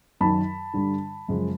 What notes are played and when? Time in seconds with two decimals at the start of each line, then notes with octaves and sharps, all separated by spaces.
0.21 F#2 D#3 F#3 A5 B5
0.74 G2 D3 G3
1.28 F#2 C#3 F3 G#3